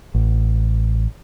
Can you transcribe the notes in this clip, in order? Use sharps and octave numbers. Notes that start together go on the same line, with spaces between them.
A1